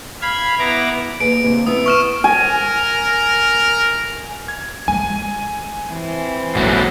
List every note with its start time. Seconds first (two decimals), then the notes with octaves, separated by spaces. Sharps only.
0.22 F5 B5 G#6
0.59 B3 E4 A#5 D6
1.20 D#2 G#4 B4 D7
1.43 D#2 C3
1.67 B3 E4 D#6
1.86 C#6 F6 E7
2.24 A#4 G#5
4.48 G#6
4.88 G#3 G#5
5.87 E3 C4
6.55 A#1 G#2 F#3 A3